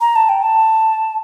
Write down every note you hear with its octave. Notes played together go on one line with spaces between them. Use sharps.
A#5
A5
G5
A5